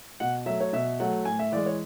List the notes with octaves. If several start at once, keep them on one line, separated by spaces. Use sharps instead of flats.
B2 F#5
F#3 A3 E5
C#5
B2 E5
F#3 A3 F#5
A2 G#5
E5
E3 G#3 D5
C#5